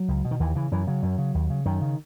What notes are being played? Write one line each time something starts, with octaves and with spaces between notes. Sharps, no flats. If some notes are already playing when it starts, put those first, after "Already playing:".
Already playing: F#3
C#2
B2
D#3
D#2 E3
C#3 E3
F#2 E3
C#3 F#3
F#2
C#3
D#2
C#3
F#2 D#3
C#3